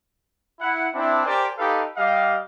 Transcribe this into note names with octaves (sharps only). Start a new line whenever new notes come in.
E4 F#5
C4 D4 E4
G4 A#4 C5 D5 G#5 A5
D#4 G4 A4 B4 F5
G3 G4 D#5 F5